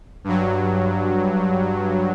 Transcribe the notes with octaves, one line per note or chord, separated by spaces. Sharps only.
G2 F#3